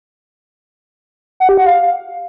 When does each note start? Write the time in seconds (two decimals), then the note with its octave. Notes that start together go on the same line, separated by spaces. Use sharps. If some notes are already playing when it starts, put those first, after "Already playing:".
1.40 F#5
1.49 G4
1.58 F#5
1.66 F5